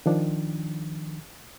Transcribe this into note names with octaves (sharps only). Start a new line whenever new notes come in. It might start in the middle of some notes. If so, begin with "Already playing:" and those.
D#3 F3 D4